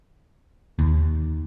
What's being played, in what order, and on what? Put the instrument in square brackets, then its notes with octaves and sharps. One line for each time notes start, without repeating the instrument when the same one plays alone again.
[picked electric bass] D#2